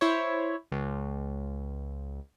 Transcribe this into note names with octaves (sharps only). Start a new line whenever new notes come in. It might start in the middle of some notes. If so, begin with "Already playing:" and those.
E4 C5 C#5
C#2